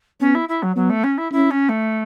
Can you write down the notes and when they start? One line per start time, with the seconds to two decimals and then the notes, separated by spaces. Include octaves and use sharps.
0.20 B3 C#4
0.35 E4
0.49 E4
0.63 F#3
0.76 F#3 B3
0.90 A3
1.04 C#4
1.18 E4
1.32 C#4 E4
1.51 C#4
1.69 A3